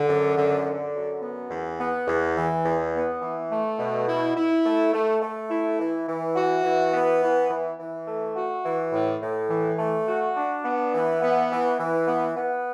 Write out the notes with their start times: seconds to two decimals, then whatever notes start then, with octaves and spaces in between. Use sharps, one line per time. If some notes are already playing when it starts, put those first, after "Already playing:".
Already playing: D3
0.08 F#2
0.37 D3
0.65 D3
0.94 F#2
1.22 B3
1.50 E2
1.80 B3
2.07 E2
2.37 E3
2.65 E2
2.94 B3
3.22 E3
3.51 A3
3.79 B2
4.08 E4
4.36 E4
4.65 A3
4.94 A3
5.21 A3
5.50 E4
5.79 E3
6.08 E3
6.36 F#4
6.64 E3
6.93 B3
7.23 E3
7.50 E3
7.79 E3
8.07 A3
8.36 F#4
8.65 E3
8.93 A2
9.22 A2
9.50 E3
9.79 A3
10.08 F#4
10.37 D4
10.65 B3
10.93 E3
11.22 B3
11.50 E3
11.79 E3
12.08 B3
12.36 B3